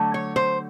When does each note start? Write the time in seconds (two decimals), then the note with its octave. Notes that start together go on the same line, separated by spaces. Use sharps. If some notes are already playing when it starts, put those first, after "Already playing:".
Already playing: D3 F#3 A3
0.14 C#5
0.36 C5